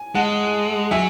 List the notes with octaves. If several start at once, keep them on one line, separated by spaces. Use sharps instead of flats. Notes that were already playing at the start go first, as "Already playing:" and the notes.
Already playing: G#5
G#3 F#5 A5
F#3 E5 G#5